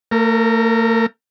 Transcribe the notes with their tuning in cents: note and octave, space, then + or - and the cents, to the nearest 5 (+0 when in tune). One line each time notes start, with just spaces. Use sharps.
A3 +40 A#4 +0